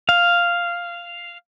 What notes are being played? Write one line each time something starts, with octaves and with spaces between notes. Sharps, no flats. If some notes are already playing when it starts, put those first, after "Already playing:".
F5